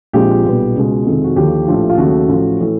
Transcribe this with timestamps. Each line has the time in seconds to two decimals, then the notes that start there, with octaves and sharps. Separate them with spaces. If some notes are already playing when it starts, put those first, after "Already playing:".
0.13 A#1 A#2 F3 G#3 C4 G4
0.44 B1 A#2 G3 B3
0.76 C#2 B2 G#3
1.06 F2 C3 D#3 G#3
1.24 F#4
1.36 D#2 D3 F3 G4
1.67 A#1 A2 F3 A3
1.90 F4
1.98 D#2 C#3 F#3 A3 F#4
2.28 A1 A2 F3
2.60 A2 E3